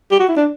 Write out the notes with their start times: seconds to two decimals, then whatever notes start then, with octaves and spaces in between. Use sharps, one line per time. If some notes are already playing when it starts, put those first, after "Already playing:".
0.11 G4
0.20 F#4
0.28 E4
0.36 D4